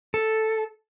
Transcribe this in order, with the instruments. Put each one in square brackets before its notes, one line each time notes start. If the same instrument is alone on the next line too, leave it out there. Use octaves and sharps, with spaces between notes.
[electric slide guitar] A4